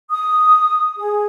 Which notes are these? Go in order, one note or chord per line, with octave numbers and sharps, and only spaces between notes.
D#6
G#4